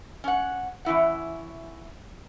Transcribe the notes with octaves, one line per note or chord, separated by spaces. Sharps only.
C#4 F#5
E3 C#4 E4 F#5